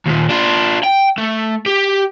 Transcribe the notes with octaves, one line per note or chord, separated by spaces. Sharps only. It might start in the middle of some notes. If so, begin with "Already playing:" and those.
D#2 A#2
D4 F4
G5
A3
G4